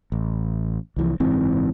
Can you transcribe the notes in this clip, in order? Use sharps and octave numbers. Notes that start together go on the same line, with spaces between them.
A1
C2 E3 F3
F#1 G#2 E3 C4